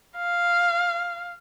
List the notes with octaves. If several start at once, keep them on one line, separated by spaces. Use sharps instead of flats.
F5